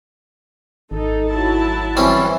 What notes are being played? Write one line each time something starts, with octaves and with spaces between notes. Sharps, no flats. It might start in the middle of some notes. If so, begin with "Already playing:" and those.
G#1 D#4 A4
F#3 E4 A5
E3 G3 C4 C#4